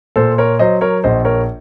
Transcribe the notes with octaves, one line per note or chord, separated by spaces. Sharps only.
A#2 A4 C5
A#4 C#5
F#3 C5 D#5
A#4 C#5
A#1 C5 D#5
A#4 C#5